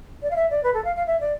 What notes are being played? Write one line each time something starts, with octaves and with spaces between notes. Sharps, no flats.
D5
F5
E5
D5
B4
A4
F5
F5
E5
D5